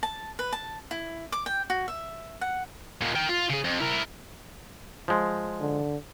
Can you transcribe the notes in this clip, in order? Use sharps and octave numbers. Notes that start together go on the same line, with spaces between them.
A5
B4
A5
E4
D6
G5
F#4
E5
F#5
D#2 A#2
A#4 G5
F4
C#3 G#4
F2
E4 A#4
F3 G#3
D3